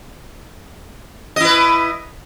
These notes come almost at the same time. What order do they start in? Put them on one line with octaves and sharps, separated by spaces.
D#5 E4 B4